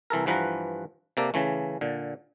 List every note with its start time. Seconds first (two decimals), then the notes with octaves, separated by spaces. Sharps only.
0.10 C2 E3 A4 A#4
0.26 G2 E3 F3 B4 F#5 A#5
1.17 C3 A#3 A4 D5
1.34 C#3 E3 A3
1.81 A#2 D3